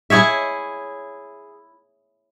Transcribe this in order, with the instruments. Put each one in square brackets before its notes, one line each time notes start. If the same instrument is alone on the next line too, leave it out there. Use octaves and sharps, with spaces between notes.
[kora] E4 G#4 C#5 E5